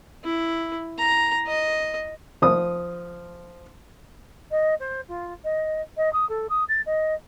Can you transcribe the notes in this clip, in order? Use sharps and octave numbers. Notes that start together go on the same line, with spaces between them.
E4
A#5
D#5
F3 D#6
D#5
C5
F4
D#5
D#5
D#6
A4
D#6
A6
D#5